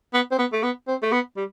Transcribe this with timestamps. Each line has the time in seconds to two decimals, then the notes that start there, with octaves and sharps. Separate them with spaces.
0.14 B3
0.31 C4
0.38 B3
0.53 A3
0.63 B3
0.88 C4
1.03 A3
1.12 B3
1.37 G3